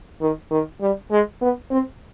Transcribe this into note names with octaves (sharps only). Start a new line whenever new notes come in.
D#3
D#3
G3
G#3
B3
C4